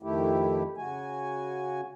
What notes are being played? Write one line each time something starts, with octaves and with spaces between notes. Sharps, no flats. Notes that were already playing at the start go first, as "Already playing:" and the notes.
F2 D#3 A3 E4 G4
C#3 F#4 G#5